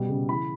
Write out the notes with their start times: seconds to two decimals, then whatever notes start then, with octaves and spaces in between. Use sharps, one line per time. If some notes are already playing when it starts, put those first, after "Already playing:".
Already playing: B2 G3
0.09 C#3
0.29 E3 B5